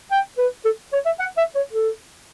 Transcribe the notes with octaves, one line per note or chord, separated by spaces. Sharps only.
G5
B4
A4
C#5
E5
F#5
E5
C#5
A4